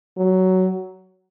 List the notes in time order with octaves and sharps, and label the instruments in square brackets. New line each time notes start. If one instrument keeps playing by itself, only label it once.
[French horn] F#3